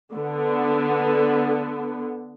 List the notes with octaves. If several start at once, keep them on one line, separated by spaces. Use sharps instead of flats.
D3 B3